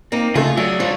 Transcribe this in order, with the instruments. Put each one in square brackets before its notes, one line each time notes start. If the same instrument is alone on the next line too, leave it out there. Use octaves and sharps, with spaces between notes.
[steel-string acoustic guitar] A#3 [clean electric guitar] C4 D#4
[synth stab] C#3 A3 [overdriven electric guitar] F4 [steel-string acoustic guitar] G#4
[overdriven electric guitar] F#3 [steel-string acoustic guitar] G#4 [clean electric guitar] A4 D5 E5
[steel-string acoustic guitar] F3 [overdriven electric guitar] F4 C#5